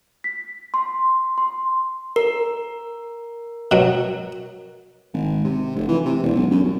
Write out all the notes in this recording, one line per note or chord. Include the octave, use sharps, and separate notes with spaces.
B6
C6
C6
A#4
B2 F#3
G#1
C3
F1
E3
C3
E1
B1
F#2
C2